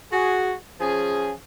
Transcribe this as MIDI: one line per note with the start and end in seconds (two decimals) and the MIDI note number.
0.12 0.53 66
0.12 0.53 68
0.79 1.32 53
0.79 1.32 61
0.79 1.32 68